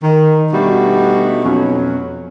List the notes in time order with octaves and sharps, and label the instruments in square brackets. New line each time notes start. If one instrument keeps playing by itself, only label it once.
[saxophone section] D#3
B2 G3 A3 D4 D#4 F#4
F2 B2 F#3 C#4